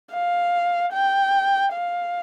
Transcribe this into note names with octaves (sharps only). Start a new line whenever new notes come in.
F5
G5
F5